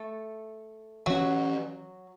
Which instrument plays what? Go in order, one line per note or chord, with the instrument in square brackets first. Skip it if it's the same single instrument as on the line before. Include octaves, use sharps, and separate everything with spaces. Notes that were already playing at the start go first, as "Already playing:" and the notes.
Already playing: [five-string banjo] A3 A4
[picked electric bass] E3 C#4 [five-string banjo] F#3 F#4